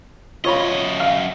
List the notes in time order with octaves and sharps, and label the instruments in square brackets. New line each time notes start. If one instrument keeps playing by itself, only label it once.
[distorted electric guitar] F#2 D#5 [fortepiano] F4 C#5 B5
[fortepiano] F5